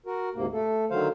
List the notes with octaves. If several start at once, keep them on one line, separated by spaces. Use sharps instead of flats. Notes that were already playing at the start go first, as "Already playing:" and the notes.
F#4 A#4
D2 G#2 C3 A#3
A3 A4
D3 D#3 F#3 C5 F5